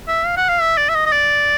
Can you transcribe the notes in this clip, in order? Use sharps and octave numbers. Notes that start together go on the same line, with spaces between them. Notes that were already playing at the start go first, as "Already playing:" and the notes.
E5
F5
F#5
F5
E5
D5
E5
D#5
D#5
D5